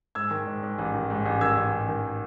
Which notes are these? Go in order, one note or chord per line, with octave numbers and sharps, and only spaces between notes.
G#2 E6 G#6
D#3
G#2
G#2
A1
D#3
G#2
A1
D#3 E6 G#6
A1
A1
D#3